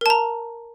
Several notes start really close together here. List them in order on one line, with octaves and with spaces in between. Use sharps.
A#4 A5 A#5